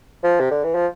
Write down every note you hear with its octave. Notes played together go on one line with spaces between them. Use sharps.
F3
C3
D3
E3
F3